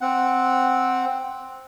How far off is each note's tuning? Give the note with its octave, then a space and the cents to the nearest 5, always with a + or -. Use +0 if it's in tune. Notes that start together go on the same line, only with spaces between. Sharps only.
C4 +0 F#5 +0